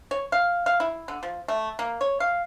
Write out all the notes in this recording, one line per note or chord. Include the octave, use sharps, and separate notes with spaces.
C#5
F5
F5
E4
D3
F3
A3
A#3
C#5
F5